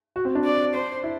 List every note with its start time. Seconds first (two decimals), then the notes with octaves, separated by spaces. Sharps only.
0.16 F#4
0.25 C4
0.35 D4
0.44 D5
0.74 C5
1.04 E4